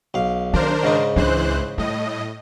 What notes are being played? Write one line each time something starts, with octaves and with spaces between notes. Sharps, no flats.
B1 F5
D#3 D4 A#4 C5
G#2 C#3 D#4
C#2 E3 D4 C5 F#6
A2 G3 D#5